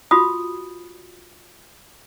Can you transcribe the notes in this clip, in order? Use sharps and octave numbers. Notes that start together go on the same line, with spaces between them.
F4 F#4 B5 D#6